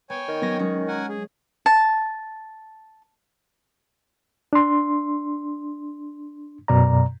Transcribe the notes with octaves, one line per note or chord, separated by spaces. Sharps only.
B3 C#5 G5 G#5
D#3
F#3 B3 C#4 A#6
F#3 G#3 C#4 C#5
A#4 F#5 G#5
G#4
A5
D4 C6
F#2 B2 D5 A#5